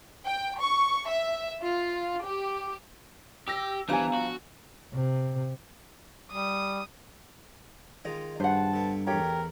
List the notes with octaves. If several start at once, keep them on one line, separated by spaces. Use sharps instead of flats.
G5
C#6
E5
F4
G4
G4 E6 A#6
E3 F3 G3 B3 D4 F5 G#5 A#5
F#4
C3
G3 D#6
D#3 G#3 F4 D#5
G2 C5 F#5 A5
D3 B3
E2 A3 G4 A#4 C#5 G5